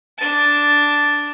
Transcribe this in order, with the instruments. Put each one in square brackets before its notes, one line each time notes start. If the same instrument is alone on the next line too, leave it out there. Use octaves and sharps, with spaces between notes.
[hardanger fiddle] D4 A5